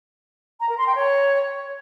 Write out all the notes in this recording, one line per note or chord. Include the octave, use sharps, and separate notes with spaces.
A#5
A#4
C6
G5
C#5